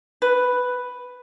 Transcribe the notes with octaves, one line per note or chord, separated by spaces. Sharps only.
B4